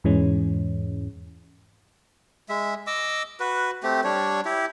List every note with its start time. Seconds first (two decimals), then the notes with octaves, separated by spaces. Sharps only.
0.04 E2 G#2 E3 G#3 C#4
2.49 G#3 E5
2.87 D#5 D6 E6
3.40 F#4 B4
3.83 A3 C4 G4
4.04 G3 D4 C#5
4.45 E4 G4